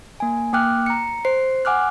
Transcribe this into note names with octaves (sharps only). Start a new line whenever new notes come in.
A#3 G#5
A#3 G5 D6 F6 F#6
A#5 C#7
C5 C7
F#5 G#5 D6 F6 F#6